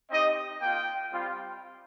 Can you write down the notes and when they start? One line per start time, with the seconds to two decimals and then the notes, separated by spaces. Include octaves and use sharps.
0.10 C4 D#4 G4 D#5
0.61 A#3 F4 G5
1.12 G3 C4 F4